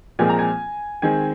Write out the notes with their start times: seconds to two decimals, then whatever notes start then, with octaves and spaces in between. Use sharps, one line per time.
0.19 A#2 F3 G#3 C4 G#5
0.29 A#5
0.39 G#5
1.02 D#3 G#3 C4 G#5